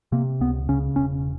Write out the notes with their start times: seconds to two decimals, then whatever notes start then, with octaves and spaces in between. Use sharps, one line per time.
0.12 C3 A#3
0.40 C#2 B3
0.69 C#3 C#4
0.96 E1 C#4